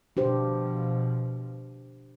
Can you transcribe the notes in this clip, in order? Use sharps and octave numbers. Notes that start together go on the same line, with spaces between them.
B2 F3 D4 G4 C5